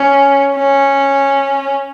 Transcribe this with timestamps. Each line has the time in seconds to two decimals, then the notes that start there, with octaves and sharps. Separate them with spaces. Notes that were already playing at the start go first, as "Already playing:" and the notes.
Already playing: C#4
0.55 C#4